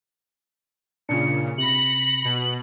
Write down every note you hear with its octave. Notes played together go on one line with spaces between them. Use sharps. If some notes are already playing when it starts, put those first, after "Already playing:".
A#2 C#3 D4 F4 C#7
C3 B5 A#6 C#7 F#7
B2